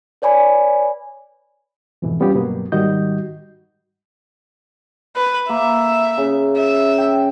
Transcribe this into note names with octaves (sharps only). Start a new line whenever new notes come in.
B4 C#5 D5 G#5 B5
F2 G#2 B2 E3
G3 B3 C#4 F4 G4
G2 B2 F#3 A#3 B3
G#2 D#3 G3 F#4 D#5 G6
B4
A#3 E5
C#3
E5
G5